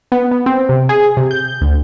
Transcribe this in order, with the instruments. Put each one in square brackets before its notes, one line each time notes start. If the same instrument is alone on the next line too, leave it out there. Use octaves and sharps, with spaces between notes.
[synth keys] B3
B3
C4
C3
G#4
C3
G6
D2